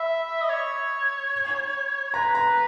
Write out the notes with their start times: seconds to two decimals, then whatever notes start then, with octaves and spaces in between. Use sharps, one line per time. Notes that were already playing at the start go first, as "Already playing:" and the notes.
Already playing: E5 B5
0.42 D#5
0.49 C#5
2.14 B4 A#5
2.35 A#5